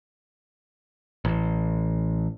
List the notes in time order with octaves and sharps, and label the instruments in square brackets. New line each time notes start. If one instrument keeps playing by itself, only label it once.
[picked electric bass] A1